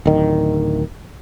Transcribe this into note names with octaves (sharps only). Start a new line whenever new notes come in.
D1 D#3